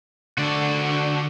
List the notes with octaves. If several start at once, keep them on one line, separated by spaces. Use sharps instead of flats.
D3 F#4 D5